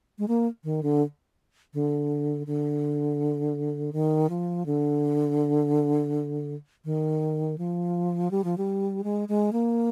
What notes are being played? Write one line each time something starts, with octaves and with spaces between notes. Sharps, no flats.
G#3
A#3
D#3
D3
D3
D3
D#3
F3
D3
D#3
F3
G3
F3
G3
G#3
G#3
A#3